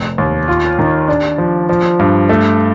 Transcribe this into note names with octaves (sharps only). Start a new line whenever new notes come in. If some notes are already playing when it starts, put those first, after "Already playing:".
Already playing: F1
D#2
F4
D#3
D4
F3
F3
G2
A3